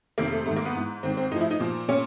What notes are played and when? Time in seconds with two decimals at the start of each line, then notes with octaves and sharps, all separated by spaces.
0.18 F2 C3 D#3 A#3
0.32 A3
0.46 G#2 A3
0.51 D#3
0.56 A#3
0.65 B3
0.75 G#2 E3
1.03 G#2 D#3 C4
1.17 C4
1.31 A2 D#4
1.36 F3 E4
1.51 D#4
1.60 A#2 F3
1.88 A#2 C#4